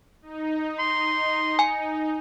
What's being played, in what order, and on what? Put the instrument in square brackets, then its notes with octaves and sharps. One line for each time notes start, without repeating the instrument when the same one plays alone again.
[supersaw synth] D#4
[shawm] C6
[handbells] G#5